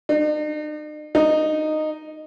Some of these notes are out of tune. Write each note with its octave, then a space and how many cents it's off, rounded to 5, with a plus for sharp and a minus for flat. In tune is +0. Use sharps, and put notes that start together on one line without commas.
D#4 -45
D#4 -10